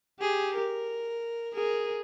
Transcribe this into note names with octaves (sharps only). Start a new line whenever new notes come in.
G4 G#4
A#4
G#4 A#4